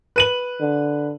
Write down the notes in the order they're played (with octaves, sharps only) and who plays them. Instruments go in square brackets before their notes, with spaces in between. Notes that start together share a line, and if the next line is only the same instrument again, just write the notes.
[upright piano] B4 D#7 F#7
[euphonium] D3